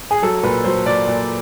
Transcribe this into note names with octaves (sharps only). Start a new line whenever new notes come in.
G#4
F#3 A4
A#2 B4
F#3 C5
A#2 D5
A#2